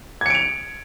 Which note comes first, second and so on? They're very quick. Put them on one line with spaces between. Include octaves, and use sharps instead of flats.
G#6 C#7 D7 F7